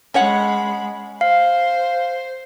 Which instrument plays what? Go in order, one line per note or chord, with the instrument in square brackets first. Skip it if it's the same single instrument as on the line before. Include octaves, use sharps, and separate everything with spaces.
[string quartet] G#3 B5 [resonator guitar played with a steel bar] C#4 C#5 F#5
[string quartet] C5 [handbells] F5